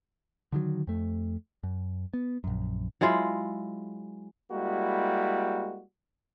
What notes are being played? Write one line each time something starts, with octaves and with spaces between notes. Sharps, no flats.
D3 D#3 F#3
F2 A3
F#2
B3
A#1 F#2
F#3 G#3 E4 F4
G3 G#3 A#3 E4 F#4